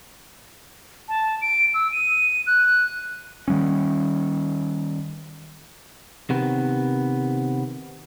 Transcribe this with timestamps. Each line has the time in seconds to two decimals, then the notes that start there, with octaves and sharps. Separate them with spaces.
1.09 A5
1.42 D7
1.74 E6
1.92 D#7
2.47 F#6
3.48 D#3 G3 C#4
6.30 C3 D#3 B3